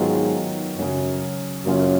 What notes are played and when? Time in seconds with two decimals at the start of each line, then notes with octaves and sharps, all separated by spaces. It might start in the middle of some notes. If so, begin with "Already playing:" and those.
Already playing: G#2 D#3 F#3 B3 F4
0.77 F#2 C#3 F#3 C#4
1.65 F#2 C#3 F#3 A#3 C#4 F4